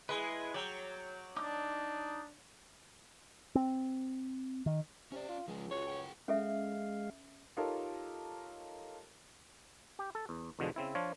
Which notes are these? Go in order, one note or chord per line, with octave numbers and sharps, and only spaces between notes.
G#3 E4 G#4 B4
F#3 D5 G5
D4 D#4 D6
C4
D#3
C3 C#4 D5
F4
C#2 F3 G#3
F4 F#4 C#5
G#4 F#5 G5
G#3 C#4 A4 E5 F5
D#4 F4 G4 A4 A#4 C#5
G4
A4
E2
E2 B2 D3 F3 G#3
C#3 C4 E4
F3 D4 F4 C#5